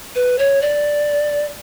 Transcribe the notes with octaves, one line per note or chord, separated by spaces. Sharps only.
B4
C#5
D5